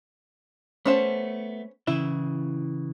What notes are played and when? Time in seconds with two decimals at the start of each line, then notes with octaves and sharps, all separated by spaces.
0.85 A3 B3 C#4 C5 A5
1.87 C#3 E3 E4